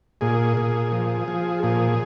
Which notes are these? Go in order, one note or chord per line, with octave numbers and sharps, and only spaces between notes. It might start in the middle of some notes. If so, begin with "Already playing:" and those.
A#2 G#4
A#2
F3
F3
A#2 G#4